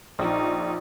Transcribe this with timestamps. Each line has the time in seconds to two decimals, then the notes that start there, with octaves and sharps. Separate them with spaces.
0.19 A#1 D#4